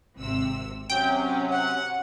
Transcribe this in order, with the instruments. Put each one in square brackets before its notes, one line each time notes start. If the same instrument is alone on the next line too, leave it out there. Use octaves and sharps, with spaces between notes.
[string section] G#1 C3 E6
[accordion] C3 F#3 [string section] C#4 [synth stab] G5
[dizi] F#5